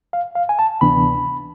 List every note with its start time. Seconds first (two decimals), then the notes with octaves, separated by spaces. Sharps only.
0.13 F5
0.35 F5
0.49 G#5
0.59 A5
0.81 D2 C3 E3 B3 D4 B5